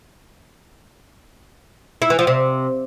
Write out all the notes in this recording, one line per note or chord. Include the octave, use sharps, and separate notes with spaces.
E4
E3
F3
C3